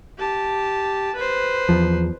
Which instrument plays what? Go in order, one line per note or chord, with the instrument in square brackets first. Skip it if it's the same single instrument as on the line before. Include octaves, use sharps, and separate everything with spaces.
[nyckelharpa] G4 A5
B4 C5
[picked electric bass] E2 F3